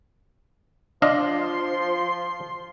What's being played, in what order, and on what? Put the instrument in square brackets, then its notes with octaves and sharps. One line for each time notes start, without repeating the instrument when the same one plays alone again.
[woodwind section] F3 C6 [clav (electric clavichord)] D4 D#5 F5